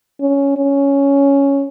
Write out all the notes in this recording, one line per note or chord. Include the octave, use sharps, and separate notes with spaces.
C#4
C#4